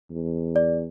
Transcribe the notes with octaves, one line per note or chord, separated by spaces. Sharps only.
E2
D5